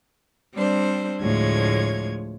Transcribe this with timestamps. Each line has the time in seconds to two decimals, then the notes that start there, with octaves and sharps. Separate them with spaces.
0.54 G3 C4 D4 C5
1.22 D2 A2 F3 G#3 C#5 G#6